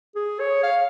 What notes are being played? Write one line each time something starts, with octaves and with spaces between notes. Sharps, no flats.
G#4
C#5
F5